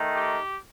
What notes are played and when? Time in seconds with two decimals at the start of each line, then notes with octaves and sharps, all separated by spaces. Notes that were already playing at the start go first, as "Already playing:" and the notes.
Already playing: D#3 A3 D#4
0.15 G4